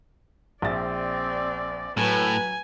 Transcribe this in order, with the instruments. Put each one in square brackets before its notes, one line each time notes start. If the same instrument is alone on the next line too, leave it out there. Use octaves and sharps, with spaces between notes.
[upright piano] A#1 E5 A6 [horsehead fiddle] C4 D5
[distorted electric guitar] A2 [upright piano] F#3 [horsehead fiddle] B4 [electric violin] G#5